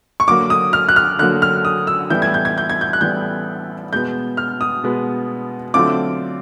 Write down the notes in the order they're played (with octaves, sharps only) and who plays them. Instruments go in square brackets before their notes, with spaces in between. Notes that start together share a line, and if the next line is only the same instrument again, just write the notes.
[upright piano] C#6
D3 F#3 A#3 D6
D#6
F6
F#6
F6
D3 F#3 A#3 F#6
F6
D#6
E6
A2 E3 G3 B3 E4 G6
G#6
G6
G#6
G6
G#6
G6
F#6
A2 E3 G3 B3 E4 G6
B2 G#3 B3 G6
F6
D#6
B2 G#3 B3
D3 F#3 A3 C4 F4 D6